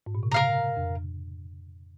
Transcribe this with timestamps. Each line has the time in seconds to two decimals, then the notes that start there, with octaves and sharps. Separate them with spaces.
0.06 G#2
0.15 A#2
0.23 C3
0.31 C#3 A#4 F5 A#5
0.76 F2